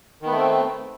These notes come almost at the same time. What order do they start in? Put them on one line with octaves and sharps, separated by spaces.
D#3 B3 A3 C4